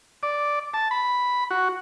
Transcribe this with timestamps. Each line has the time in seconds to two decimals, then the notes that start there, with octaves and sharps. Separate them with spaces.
0.23 D5
0.74 A5
0.91 B5
1.50 F#4